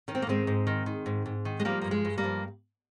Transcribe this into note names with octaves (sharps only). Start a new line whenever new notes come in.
D#3 C#4
C4
A#3
G#2 G#3 C4
G#2
D#3
D#3
G#2
G#2
D#3
G#3
F3 G3 A#3
G2 A#3
G#3
G2
G3 A#3
F3